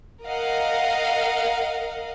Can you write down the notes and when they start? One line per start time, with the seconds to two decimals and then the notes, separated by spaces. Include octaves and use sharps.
0.24 A#4 D#5 F5 F#5